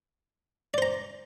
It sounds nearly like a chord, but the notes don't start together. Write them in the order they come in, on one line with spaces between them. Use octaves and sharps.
D5 C5 A#5